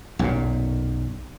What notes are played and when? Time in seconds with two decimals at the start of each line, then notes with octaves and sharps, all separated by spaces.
0.19 B1 F#2 A#2